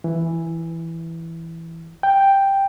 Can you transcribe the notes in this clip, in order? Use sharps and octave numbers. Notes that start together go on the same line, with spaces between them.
E3
G5